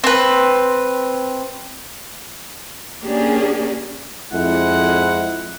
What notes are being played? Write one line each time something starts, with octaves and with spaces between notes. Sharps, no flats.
C4 B4
A#3 C#4 D4 G4 G#4
F2 G#3 E4 F#5